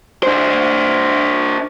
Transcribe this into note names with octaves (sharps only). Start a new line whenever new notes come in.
D4 C5